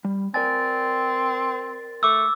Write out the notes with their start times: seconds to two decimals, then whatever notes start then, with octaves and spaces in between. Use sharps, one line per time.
0.05 G3
0.34 C4 A#4 D5 G#5 A6
2.03 A3 D6 E6